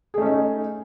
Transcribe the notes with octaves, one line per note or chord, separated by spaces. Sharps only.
A3 C#4 D#4 G#4